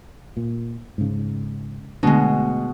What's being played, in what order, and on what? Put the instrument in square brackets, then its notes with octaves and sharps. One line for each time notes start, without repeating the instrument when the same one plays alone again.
[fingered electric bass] A#2
G#2 C#3
[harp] B2 G#3 [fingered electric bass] D3 A3 D4